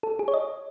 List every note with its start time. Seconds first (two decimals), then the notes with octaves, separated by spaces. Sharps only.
0.03 A4
0.19 G#4
0.28 C#5
0.34 D#5